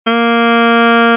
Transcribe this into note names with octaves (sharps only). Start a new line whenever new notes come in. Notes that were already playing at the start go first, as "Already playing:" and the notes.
A#3